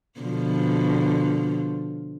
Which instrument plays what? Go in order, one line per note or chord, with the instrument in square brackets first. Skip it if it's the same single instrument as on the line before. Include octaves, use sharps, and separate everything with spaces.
[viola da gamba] B2 D3 F3